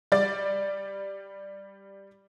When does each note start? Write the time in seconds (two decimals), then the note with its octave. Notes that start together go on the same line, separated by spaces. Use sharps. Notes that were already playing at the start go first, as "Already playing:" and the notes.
0.12 G3 D5 A6